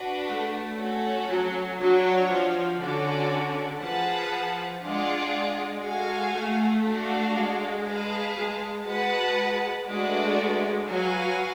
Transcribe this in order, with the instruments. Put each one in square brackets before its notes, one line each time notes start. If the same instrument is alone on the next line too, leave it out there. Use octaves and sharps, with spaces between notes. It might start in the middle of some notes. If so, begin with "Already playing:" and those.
Already playing: [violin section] D4 F#4 B4
[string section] A3
[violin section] C#4 F#4 A4
[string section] F#3
[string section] F#3 [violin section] D4 F#4 C#5
[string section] F3
[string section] D3 [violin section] C#4 F#4 A4 D5
[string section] F3 [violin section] G#4 B4 F#5 A5
[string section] G#3 [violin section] D4 F4 G#4 D5 F#5
[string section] G#3
[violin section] F#4 A4 F5 G#5
[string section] A3
[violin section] D4 F#4 A4 F5
[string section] G#3
[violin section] G#4 B4 F5 A5
[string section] G#3
[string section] G#3 [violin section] F#4 B4 F#5 A5
[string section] G#3 [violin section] A3 D4 F#4 B4 D5
[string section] F#3 [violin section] F#4 B4 F5 G#5